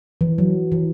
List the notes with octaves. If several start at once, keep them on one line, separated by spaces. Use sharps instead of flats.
E3
F#3
E3